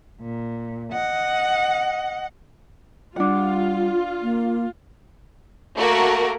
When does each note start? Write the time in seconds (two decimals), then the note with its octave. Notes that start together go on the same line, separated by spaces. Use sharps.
0.21 A#2
0.92 D#5 F#5
3.16 G3 D4 F4 F#5
4.23 A#3
5.77 A3 A#3 F#4 A#4